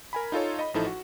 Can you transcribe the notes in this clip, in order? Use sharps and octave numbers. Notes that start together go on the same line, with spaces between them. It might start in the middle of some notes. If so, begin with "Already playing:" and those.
A#4 G#5 B5
D#4 F4 A4 C#5
D#5 B5
A1 F3 D#4 E4 A4
F#4